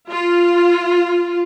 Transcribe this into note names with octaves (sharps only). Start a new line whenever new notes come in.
F4